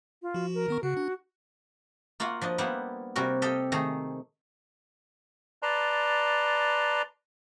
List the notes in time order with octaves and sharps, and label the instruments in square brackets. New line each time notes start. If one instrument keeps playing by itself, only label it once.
[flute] F4
[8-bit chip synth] F3 F#4
[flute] A#4
[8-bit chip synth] D#3 B3 C#6
[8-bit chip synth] C#3 [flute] F#4
[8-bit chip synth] D4
[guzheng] A#3 F4 F#4 F5 F#5
F3 D4 D#5
G3 A#3 B3 E4 C5 F#5
C3 G3 F#4 A#4
G4 A4 D#5 F5 G5
D#3 A3 G#4 A#5
[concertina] B4 D5 A5 A#5 C6